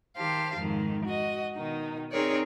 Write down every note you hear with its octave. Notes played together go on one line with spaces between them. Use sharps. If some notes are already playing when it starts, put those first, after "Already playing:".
D#3 G4 C5 F5 A5
F2 G#2 D#3
F#4 D#5
B2 D#3 D#4
C4 D#4 G#4 A#4 C#5 D5